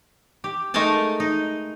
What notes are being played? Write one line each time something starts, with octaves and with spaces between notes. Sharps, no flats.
G4
G#3 A3 D#4 A#4 G#5 A5
D#4